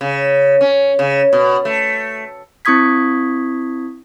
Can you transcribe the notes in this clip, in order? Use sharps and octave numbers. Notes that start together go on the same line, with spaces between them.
C#3
C#4
C#3
B2
A3
C4 E4 C#6 D#6 G#6 B6